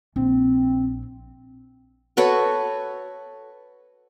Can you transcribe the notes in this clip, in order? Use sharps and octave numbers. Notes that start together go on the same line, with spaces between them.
A#1 C4
F#4 A4 B4 C#5